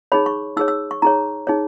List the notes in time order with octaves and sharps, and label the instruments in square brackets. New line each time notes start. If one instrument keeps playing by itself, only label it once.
[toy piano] D#4 G#4 C#5 B5
C#6
D#4 G#4 C#5 E6
E6
C#6
D#4 G#4 C#5 A#5
D#4 G#4 C#5